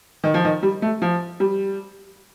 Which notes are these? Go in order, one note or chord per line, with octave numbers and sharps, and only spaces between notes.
D#3
F3
D#3
G3
A3
F3
G3